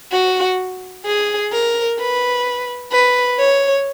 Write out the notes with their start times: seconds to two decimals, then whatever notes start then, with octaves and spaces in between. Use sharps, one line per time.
0.12 F#4
1.05 G#4
1.52 A#4
1.99 B4
2.92 B4
3.39 C#5